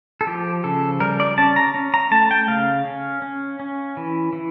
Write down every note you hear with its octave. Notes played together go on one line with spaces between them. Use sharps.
A4
F3 G4
C#3 A4
G3 A#4
D5
C#4 A5
A#5
C#4
A#5
A3 A5
G5
C#3 F5
C#4
C#4
C#4
E3
E3